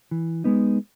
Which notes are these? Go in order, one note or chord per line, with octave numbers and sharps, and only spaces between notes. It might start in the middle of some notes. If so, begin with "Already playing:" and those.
E3
G#3 B3 D#4